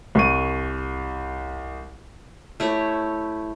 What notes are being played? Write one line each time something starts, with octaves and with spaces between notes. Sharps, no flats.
C2 C#6 D#7
A3 E4 G4 C#5